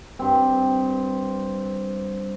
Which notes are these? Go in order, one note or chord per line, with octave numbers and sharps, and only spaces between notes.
G2 C4